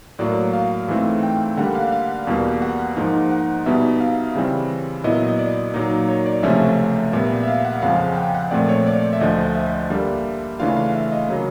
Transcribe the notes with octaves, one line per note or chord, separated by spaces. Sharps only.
A2 F#3 A#3 D5
F5
G#2 E3 A3 C4
G5
D3 G3 A#3 F#5
F5
F5
E2 B2 G3 A#3
F#5
G#2 F3 A#3 D#4
F#5
B2 G3 B3 D#4 E5
F5
C#3 E3 G3 C4
A#2 F#3 B3 E4 D#5
D#5
D5
A#2 F#3 A#3 D#4
C#5
D5
C#2 C3 F3 A3 C#4 E5
A#2 G3 B3 E5
E5
F5
F#5
F2 C#3 F3 G#3 F5
F#5
G5
F#5
A#2 F3 A3 C4 D5
C#5
D5
E5
D2 D3 F3 D#5
E5
D3 G3 A#3
C#3 E3 A3 D4 F4 F5
F5
E5
D#5
C#3 F#3 A#3